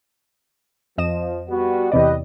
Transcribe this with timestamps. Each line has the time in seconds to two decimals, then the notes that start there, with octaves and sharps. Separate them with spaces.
0.98 F2 F3 D#5 E7
1.48 G3 B3 F#4
1.92 E2 C3 G4 B4 D5 D#5